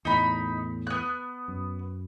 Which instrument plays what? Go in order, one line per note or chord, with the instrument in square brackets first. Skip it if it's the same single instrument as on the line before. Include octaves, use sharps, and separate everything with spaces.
[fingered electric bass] E2 A2 [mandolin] D#4 B5
[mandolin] B3 F#6
[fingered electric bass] F#2